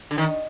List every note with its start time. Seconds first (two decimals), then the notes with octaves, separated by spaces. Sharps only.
0.11 D3
0.18 D#3